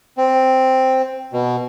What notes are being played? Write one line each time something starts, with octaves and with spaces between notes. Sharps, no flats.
C4
B2